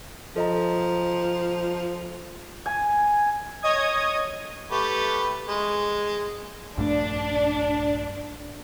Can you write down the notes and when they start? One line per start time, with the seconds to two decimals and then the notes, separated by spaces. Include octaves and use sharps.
0.36 F3 A4 D#5 A#5
2.66 G#5
3.62 C#5 D#5 D#6 G#6
4.71 A3 G4 B4
5.48 G#3
6.77 A#1 G2 A3 D4